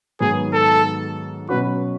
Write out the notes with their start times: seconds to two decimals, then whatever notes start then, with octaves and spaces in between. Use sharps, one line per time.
0.20 G#2 D#3 F#3 B3 G#4
0.53 A4
1.49 B2 F#3 C#4 F#4 B4